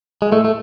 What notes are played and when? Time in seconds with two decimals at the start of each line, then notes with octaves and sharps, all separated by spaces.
0.22 G#3
0.32 A2 A3
0.45 A3